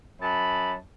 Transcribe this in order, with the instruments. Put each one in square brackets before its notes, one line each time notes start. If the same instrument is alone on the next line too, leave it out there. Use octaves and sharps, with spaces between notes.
[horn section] F#2 A5 B5